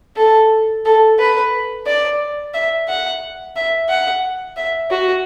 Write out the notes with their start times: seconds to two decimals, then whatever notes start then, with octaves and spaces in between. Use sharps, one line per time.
0.17 A4
0.85 A4
1.19 B4
1.87 D5
2.54 E5
2.88 F#5
3.56 E5
3.89 F#5
4.57 E5
4.90 F#4